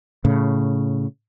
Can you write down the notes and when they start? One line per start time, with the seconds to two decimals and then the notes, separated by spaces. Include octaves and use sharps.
0.25 A2 C#3